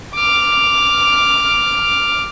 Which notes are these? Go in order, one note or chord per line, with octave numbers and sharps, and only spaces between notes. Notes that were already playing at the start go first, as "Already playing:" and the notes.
D6 F6